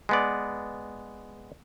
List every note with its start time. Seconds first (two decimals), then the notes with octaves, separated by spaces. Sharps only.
0.09 G#3 B3 D5